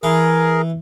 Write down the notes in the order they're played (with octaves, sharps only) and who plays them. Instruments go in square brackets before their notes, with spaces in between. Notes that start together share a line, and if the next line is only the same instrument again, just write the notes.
[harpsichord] E3 [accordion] G#4 A#4